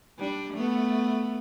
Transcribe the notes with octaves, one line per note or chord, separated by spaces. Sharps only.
G3 D4
A3 B3